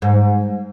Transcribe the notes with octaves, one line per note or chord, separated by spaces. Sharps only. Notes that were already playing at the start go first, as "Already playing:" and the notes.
G#2